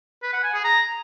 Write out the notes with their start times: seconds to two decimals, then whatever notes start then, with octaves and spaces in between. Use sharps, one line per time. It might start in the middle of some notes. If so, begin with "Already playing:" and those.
0.23 B4
0.33 F#5
0.43 G#5
0.54 G#4
0.64 A#5